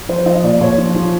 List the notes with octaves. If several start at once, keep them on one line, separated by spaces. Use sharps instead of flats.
F3 C5
F3 D#5
A#2 D5
A#2 C#5
F3
F3